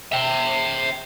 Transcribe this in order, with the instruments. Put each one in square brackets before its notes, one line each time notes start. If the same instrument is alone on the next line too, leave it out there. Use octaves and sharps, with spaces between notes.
[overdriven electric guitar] E5 G5